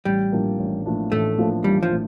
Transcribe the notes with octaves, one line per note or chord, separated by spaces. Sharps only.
A1 G3
A2 F3 A#3 D4
A1
A2 F3 A#3 D4
A1 A3
A2 F3 A#3 D4
A1 G3
F3
A2